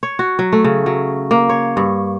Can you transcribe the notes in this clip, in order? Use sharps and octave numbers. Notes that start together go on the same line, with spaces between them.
C#5
F#4
F#3
A3
C#3
F#3
A#3
C#5
G2